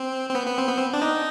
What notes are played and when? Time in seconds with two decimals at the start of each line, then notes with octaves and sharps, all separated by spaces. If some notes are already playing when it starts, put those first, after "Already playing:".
Already playing: C4
0.29 C4
0.35 B3
0.46 B3
0.58 C4
0.69 B3
0.77 C4
0.93 D4
1.02 D#4